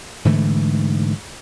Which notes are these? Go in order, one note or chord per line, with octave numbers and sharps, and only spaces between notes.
G#2 D3 E3 A3